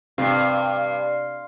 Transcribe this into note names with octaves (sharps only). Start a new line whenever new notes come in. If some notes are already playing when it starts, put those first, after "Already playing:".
G2 C3 F5 C6